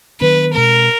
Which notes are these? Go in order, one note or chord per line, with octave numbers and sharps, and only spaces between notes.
D#3 F#3 B3 D4 B4
B2 G#3 C4 A#4